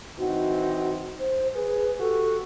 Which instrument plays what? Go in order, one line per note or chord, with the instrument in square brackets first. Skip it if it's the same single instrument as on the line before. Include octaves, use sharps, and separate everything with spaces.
[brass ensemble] E3 C4 D#4 [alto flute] F#4
[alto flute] C5
[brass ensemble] G#4 [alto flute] B4
[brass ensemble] F#4 G4 [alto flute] A4